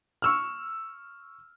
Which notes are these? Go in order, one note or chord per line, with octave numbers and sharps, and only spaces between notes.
C#6 E6 F6